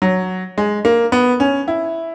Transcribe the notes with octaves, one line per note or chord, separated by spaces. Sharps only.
F#3
G#3
A#3
B3
C#4
E4